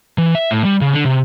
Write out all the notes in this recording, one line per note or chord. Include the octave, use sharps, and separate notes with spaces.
E3
E5
A2
G3
C#3
D3
C3